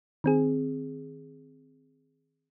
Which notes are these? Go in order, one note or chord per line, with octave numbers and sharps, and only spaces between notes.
D#3 C4 G#4